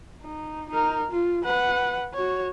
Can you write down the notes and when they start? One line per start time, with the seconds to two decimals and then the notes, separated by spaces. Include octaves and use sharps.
0.22 D#4
0.70 D#4 A#4
1.11 F4
1.44 B4 F#5
2.14 F#4 C#5